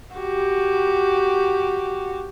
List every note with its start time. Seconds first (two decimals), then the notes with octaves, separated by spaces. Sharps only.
0.16 F#4 G4